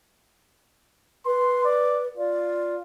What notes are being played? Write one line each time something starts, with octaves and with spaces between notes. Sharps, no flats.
B4 C6
D5
F4 D5